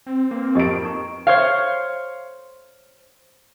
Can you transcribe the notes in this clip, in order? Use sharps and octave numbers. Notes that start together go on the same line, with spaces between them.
C4
A#3 B4
F2 G4 D#5 G5 D7
D#4 A#5 C#6
C5 C#5 F5